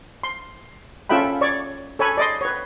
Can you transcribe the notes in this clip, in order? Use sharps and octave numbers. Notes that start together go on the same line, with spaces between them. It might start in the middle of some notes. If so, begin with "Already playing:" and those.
C6
C#4 F4 A4 E5 G5 B5
C#5 D5 C#6
A4 C#5 G#5 B5
D5 D#5 C6
B4 C#5